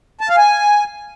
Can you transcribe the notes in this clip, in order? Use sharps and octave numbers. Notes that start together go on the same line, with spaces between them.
A5
F5
G#5